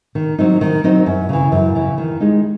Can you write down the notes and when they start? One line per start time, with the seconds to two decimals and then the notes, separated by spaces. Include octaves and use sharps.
0.15 D#3
0.38 F#3 C4 D#4
0.61 D#3
0.84 F#3 C4 D#4
1.06 F#2
1.29 C#3 E3
1.52 F#2
1.75 C#3 E3
1.98 D#3
2.20 G#3 D#4